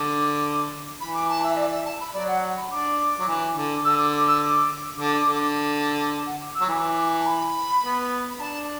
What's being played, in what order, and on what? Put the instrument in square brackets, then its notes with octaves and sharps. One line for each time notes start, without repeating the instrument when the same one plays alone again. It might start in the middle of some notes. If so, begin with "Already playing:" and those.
Already playing: [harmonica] D3 [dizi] D6
[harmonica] E3 [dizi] B5
[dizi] D6
A5
E5
D5
E5
A5
B5
[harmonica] F#3 [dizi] D5
[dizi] F#5
F#5
B5
[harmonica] D4 [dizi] D6
[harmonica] F#3
E3
D3
[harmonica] D3 [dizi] E6
[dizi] D6
D6
E6
D6
[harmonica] D3
D3
[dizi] A5
F#5
D6
E6
[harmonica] F#3
[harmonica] E3 [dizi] D6
[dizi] A5
B5
[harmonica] B3
[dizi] B5
[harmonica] D4 [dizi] A5